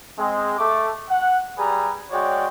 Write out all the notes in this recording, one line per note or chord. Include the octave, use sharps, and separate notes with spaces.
G#3 C4
A3 D6
F#5
G3 G#4 B4 G#5 A#5
G#3 F#4 C#5 D5 G5